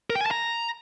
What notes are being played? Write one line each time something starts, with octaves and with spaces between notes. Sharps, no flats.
A#4
G5
G#5
A5
A#5